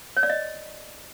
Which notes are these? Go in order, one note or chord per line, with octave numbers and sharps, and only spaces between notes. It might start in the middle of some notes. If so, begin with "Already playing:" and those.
C#5
D5
D#5